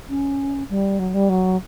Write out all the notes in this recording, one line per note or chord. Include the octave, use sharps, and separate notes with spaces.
C#4
G3
F#3
G3
F#3